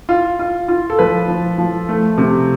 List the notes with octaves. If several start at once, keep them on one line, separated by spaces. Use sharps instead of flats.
F4
F4
F4
A4
F3 B4
F3
F3
A3
C3